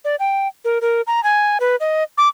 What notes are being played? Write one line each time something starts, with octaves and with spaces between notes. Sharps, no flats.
D5
G5
A#4
A#4
A#5
G#5
B4
D#5
D6